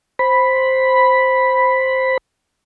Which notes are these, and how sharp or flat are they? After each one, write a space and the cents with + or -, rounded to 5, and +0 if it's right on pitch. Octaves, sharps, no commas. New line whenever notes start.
C5 +0 B5 +0